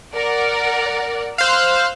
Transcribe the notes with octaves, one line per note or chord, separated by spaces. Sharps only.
A#4 D5 F#5
C5 F5 E6 F#6